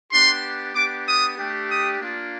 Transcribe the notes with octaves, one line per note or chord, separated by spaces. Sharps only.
B3 D4 G4 C6
B3 D4 G4 D6
D#6
A3 D4 G4
D#6
A#3 D4 F4